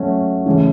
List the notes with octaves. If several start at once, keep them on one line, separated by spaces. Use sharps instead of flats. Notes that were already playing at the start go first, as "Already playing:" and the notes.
Already playing: F#3 A3 C#4
C#3 E3 A3 C#4